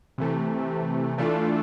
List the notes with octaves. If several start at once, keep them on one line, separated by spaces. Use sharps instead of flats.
C3 E3 A3
E3 A3 D4 F4 A4